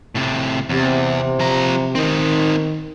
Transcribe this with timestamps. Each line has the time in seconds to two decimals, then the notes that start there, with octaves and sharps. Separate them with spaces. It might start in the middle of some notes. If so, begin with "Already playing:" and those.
0.15 A2 C3
0.69 E2 C3
1.39 F3 A#5
1.95 D#3 C4 D#4